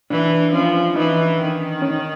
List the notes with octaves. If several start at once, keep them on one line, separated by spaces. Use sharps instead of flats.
E3 D4
F3 C#4
E3 D#4
D#3
C#4